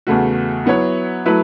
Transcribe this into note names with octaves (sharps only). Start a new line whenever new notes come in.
E2 C#3 A3 F#4
F#3 B3 E4 C#5
F#3 A3 E4 B4